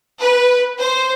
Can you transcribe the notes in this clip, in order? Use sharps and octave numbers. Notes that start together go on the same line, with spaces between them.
B4
C5